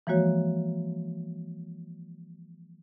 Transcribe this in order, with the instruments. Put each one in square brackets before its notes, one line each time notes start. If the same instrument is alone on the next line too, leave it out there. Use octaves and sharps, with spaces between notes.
[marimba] E3 F3 G#3 A#3 F#4 C#5